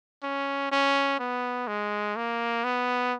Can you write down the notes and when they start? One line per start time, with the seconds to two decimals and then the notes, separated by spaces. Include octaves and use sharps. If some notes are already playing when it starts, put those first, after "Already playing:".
0.23 C#4
0.71 C#4
1.19 B3
1.68 G#3
2.16 A#3
2.64 B3